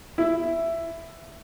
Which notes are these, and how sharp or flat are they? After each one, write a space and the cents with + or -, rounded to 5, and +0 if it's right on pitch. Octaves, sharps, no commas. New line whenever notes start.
E4 +10